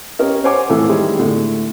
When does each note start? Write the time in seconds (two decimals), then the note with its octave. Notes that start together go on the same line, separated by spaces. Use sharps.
0.19 C#4 G4 A#4 D#5
0.44 C5 C#5 F#5 G#5 D6
0.69 F2 A2 E3 A4
0.89 D#3 G3 G#3
1.19 A2 D3